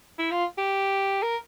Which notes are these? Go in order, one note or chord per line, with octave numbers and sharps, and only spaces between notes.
E4
F4
G4
A#4